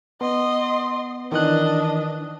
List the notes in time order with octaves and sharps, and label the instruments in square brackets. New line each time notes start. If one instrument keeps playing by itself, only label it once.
[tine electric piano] B3 [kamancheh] D#5 C6
[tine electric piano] D#3 E3 F#6 [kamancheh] D4 D#5